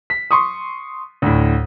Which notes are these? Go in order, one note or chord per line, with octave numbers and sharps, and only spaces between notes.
B6
C6 C#6 D#6
D2 A2